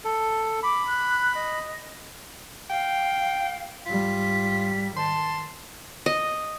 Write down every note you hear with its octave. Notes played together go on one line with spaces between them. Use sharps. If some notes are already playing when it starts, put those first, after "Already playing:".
A4
B5 D6
F#6
D#5
F5 G5
G#2 G3 F4 B6
D#3 A5 C6
D#5